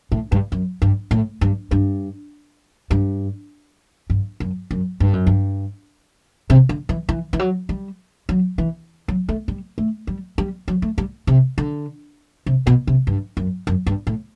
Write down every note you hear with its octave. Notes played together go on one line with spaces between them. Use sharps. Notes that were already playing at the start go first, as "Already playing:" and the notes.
A2
G2
F#2
G2
A2
G2
G2
G2
G2
F#2
F#2
G2
F#2
G2
C3
D3
E3
E3
E3
F#3
G3
F#3
E3
F#3
A3
G3
A3
G3
G3
F#3
A3
G3
C3
D3
C3
B2
C3
G2
F#2
F#2
G2
A2